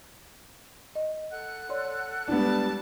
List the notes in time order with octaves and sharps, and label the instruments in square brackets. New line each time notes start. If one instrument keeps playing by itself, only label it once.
[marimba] D#5
[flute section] A4 F#5 F#6
[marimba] C#5 D5 C6
[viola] G3 A5 [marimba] G#3 E4 [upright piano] B3 D4